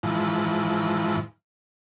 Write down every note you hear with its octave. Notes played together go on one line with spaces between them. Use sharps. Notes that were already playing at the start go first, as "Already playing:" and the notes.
G#2 E3 F3